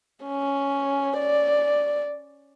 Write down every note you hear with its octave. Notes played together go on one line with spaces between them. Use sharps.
C#4
D5